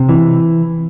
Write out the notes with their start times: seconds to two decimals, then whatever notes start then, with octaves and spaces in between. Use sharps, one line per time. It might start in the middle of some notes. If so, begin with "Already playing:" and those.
Already playing: C3
0.09 E3